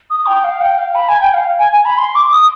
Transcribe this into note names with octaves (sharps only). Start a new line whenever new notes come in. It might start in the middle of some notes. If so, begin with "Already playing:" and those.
D#6
G5
F5
G5
F5
B5
G#5
G5
F5
G#5
G#5
B5
C6
D6
D#6